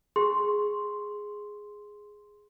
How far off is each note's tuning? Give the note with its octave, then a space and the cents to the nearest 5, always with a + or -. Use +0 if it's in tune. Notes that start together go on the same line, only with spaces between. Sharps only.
G#4 +0 C6 +0